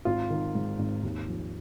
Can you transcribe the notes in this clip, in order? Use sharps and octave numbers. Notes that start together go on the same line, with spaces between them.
G#1 F4
D#3
G#2
G#1
D#2
F3